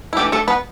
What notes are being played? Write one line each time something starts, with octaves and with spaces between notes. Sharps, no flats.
E4
E3 A3 D4 G4
A3 A4
B3 B4